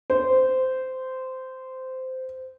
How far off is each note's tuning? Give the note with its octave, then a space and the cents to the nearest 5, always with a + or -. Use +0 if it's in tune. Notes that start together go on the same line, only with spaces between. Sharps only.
C5 -15